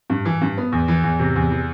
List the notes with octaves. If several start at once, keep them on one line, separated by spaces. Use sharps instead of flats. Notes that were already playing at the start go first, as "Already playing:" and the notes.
G2
E3
G2
B3
E2
E3
E2
C3
E2
E3